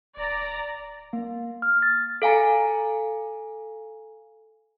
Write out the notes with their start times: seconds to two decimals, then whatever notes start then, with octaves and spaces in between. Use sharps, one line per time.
0.17 D1 D5 A#5
1.13 A#3
1.62 F6
1.82 A6
2.22 A4 F5 G#5 A#5